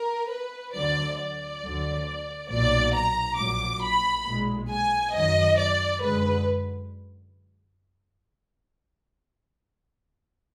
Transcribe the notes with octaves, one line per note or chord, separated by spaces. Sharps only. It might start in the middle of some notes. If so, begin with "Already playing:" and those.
Already playing: A#4
B4
D2 D3 F#3 D5
D5
D2 D3 F#3
B1 A#2 F#3 D5
A#5
A#1 A#2 F#3 D6
B5
B1 A#2 G#3
G#5
F#2 D#3 F#3 D#5
D5
F#2 D3 G#3 B4